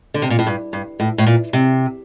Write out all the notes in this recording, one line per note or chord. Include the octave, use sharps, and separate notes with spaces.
D3
C3
A#2
A2
G2
G2
A2
A2
A#2
C3